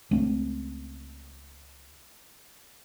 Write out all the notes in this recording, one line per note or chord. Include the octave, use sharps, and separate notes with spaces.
C#2 A3 C4 D4